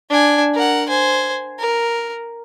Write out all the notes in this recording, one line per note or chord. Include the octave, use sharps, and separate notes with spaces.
D4 G#5
A#4 F#5
C5 G#5
A#4